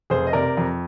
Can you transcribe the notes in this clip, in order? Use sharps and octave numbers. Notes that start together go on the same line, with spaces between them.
F1 G#4 C5
D#5
C3 A#4 D5
F2